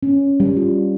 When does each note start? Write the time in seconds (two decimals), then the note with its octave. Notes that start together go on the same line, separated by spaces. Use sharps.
0.03 C#4
0.40 G3
0.57 F4